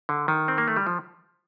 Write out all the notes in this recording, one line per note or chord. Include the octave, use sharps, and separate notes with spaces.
D3
D#3
C4
A#3
A3
G3
F3